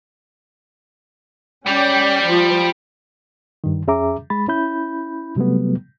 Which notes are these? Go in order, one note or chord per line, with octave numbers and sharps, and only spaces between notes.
G3 C#4 D5 G5
F3
G2 D#3
F2 C#4 G#4 E5 A#5 D6
G#3 B5 A6
C#4 E4 B5 G6
C3 F#3 G3 A3 B3